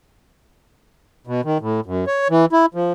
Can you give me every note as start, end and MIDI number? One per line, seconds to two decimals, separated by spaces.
1.27 1.41 47
1.45 1.58 51
1.61 1.80 45
1.86 2.05 42
2.07 2.28 73
2.30 2.46 52
2.52 2.66 64
2.75 2.93 53